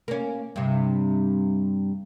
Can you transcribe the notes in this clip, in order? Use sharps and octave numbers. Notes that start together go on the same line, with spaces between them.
A#3 C#4
G2 C3